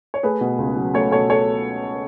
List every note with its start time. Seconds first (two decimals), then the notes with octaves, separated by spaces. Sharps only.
0.14 C#5
0.23 A3 G#4 B4
0.41 B2
0.58 C#2
0.77 F#3
0.94 A3 A4 C#5
1.11 B2 A4 C#5
1.30 A4 C#5